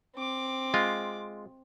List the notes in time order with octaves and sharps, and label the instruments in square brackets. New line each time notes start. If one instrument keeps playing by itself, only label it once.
[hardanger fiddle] C4 D6
[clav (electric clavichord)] G#3 F4